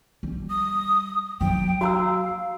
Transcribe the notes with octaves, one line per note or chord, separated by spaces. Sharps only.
G3
D#6
F#3 A#3 G5
F#4 F5 A#5 E6